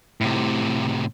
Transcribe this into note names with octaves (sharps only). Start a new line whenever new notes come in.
A2 C3